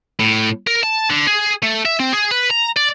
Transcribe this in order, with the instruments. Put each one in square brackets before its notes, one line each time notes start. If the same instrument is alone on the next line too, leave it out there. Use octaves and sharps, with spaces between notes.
[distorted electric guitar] A2
A#4
A5
D3
G#4
A3
E5
C4
G#4
B4
A#5
D5